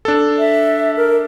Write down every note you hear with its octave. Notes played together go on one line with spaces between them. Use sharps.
D4 A4
E5
A#4